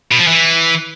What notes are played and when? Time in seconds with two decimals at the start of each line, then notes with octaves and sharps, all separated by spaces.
0.12 B2
0.20 F3
0.27 E3